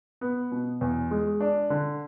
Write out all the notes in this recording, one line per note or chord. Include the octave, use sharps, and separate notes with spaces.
B3
B2
E2
G#3
D4
D3